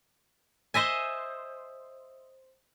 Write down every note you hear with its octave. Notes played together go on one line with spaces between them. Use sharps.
C5 D#5 E5 G#5